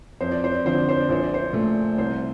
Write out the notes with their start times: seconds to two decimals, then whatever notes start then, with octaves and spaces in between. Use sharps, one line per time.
0.21 F2 C5
0.31 D5
0.44 C5
0.54 D5
0.65 D3 F3 C4 C5
0.78 D5
0.89 C5
1.00 D5
1.09 A#1 C5
1.23 D5
1.34 C5
1.53 A#2 A3
1.98 C2 C5